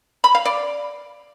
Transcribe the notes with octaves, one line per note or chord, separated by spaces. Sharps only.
B5
F5
D5